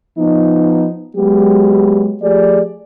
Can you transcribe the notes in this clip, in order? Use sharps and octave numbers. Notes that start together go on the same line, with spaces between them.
F3 B3 D#4
F#3 G#3 B3 G4
F3 A3 G4 G#4 D5